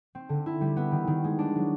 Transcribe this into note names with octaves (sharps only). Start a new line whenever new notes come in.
C4
D3
E4
G3
B3
D#3
D#3
G#3
D4
F#3